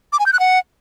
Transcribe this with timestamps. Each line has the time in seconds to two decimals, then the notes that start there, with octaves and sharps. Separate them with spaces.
0.13 D6
0.19 G#5
0.26 G6
0.33 F#6
0.40 F#5